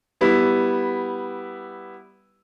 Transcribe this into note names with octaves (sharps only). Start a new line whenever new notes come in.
G3 B3 E4